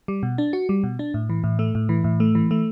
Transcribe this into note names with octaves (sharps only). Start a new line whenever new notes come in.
G3
B2
D4
F#4
G3
B2
D4
A2
E3
A2
A3
A2
E3
A2
A3
E3
A3